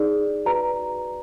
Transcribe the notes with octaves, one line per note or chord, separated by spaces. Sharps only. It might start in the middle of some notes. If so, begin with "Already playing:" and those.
Already playing: D#4 G#4 D5
F#4 B4 D5 A#5